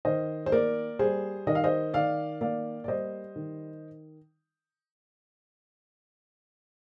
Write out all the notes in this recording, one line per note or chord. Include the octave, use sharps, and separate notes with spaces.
D#3 C5 D#5
C5
A#3 A#4 D5
G3 G#4 C5
D#3 D#5
F5
C5 D#5
D#3 D5 F5
A#3 D5 F5
D5
G3 C5 D#5
D#3